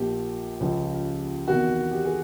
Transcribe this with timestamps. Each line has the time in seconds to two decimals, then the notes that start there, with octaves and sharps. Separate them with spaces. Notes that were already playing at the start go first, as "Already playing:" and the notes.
Already playing: A#1 A#2 F3 G4
0.60 C#2 C#3 F3
1.47 E2 C3 D#3 F#4
1.91 G4
2.05 G#4